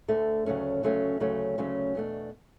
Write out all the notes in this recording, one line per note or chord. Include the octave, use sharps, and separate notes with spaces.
D2 D3 A3
D2 C#3 F#3 A3 C#4
D2 C#3 F#3 A3 C#4
D2 C#3 F#3 A3 C#4
D2 C#3 F#3 A3 C#4
E2 B2 A3 D4